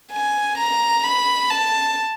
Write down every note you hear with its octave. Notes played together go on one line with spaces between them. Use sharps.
G#5
A#5
B5
A5